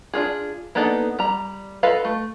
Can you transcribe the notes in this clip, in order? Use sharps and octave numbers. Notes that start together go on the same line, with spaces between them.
D4 F4 G#4
A#3 B3 D4 D#4 A4
G3 A#5
F4 A4 B4 D#5 F5
A3